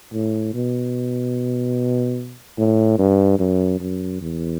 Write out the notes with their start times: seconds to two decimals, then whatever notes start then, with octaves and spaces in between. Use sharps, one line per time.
0.13 A2
0.54 B2
2.58 A2
2.99 G2
3.39 F#2
3.80 F#2
4.21 E2